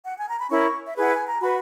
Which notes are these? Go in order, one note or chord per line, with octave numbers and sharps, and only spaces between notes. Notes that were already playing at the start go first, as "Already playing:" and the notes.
F#5
G#5
A#5
B5
C#4 E4 A#4 C#5 C#6
E5
E4 G#4 B4 F#5
G#5
A#5
F#4 B4 B5